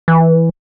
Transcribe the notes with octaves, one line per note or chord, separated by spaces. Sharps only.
E3